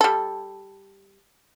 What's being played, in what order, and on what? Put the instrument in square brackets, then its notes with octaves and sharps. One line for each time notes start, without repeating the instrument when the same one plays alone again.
[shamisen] G3 A4